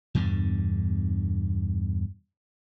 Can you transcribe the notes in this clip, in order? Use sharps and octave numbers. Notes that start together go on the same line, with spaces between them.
E2 G2 B2 D3